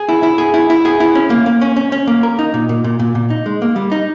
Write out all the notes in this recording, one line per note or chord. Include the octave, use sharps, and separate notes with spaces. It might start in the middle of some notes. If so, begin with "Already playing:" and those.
Already playing: G#4
E4
E4
G#4
E4
E4
G#4
E4
C#4
A#3
A#3
C#4
C#4
C#4
A#3
A#4
D#4
A#2
A#2
A#2
A#2
A#2
D#4
G#3
A#3
G3
D#4